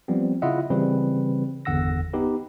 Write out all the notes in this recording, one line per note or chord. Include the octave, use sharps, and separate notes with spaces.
F3 G3 B3 C4
C#3 E4 F4 D#5 E5 F#5
C#3 E3 G3 C4 B4
G1 E2 D3 F#5 E6 A#6
B3 D#4 G4 B4